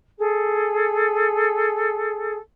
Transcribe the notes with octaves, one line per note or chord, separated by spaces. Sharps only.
G#4 A4